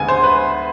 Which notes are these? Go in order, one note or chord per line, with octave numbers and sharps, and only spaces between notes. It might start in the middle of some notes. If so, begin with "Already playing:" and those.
Already playing: D2 D3 G#3 B3 G#5
C5
B4